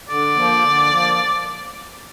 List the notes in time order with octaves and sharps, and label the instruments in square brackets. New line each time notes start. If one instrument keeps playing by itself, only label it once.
[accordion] D3 [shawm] D5
[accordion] F3 A#3
D3
F3 A#3